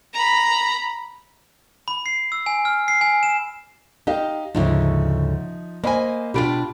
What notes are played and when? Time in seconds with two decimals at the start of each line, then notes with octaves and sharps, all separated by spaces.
0.13 A#5 B5
1.88 B5
2.06 C7
2.32 E6
2.46 G#5
2.65 F6
2.88 C7
3.01 G#5
3.23 E7
4.07 D#4 G4 D#5 F5
4.55 D2 G#2 C#3 F3 D#4 E5
5.84 A#3 C5 D#5 G#5 B5
6.34 B2 D4 F4 G4 B5 D7